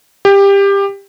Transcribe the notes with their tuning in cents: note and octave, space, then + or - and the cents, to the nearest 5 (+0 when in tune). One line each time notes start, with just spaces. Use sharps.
G4 +20